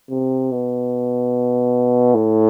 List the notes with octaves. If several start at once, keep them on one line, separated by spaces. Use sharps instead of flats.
C3
B2
A2